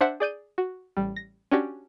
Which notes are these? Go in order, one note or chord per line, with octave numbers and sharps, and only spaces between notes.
D4 C5 E5 F#5
G#4 D5 G6 D#7
F#4
A1 G3
A#6
C#4 D4 F#4 G4 D5